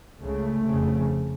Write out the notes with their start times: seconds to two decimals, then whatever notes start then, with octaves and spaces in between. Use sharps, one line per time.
0.21 C#2 C#3 A3
0.65 F1 F2 C#3